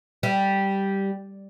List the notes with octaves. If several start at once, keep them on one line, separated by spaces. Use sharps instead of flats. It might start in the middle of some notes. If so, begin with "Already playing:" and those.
G3